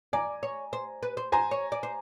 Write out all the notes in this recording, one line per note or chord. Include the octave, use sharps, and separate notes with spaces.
D5 G#5 A#5
C#5
C5
B4
C5
C5 G#5 A#5
C#5
D5
C5